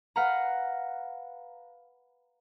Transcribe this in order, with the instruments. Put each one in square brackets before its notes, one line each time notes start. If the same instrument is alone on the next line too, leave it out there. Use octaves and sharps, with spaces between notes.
[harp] B4 F5 F#5 A#5